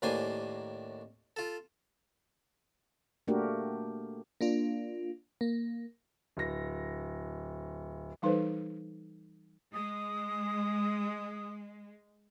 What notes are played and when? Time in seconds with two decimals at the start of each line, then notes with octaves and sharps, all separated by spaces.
0.02 D#2 A2 A#3 D4 C5 G#5
1.36 F4 A4
3.28 A3 A#3 D4 F#4 G4 A#4
4.41 A#3 D4 F4
5.41 A#3
6.37 D1 A#6
8.22 E3 G3 D#4 A4 B4 C5
9.74 G#3 D#6